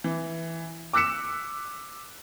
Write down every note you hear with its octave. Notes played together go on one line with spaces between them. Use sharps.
E3
D6 E6 F#6 B6 C#7 E7